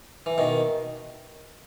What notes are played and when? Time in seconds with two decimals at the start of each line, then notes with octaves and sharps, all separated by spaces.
0.26 E3
0.38 B2 D#3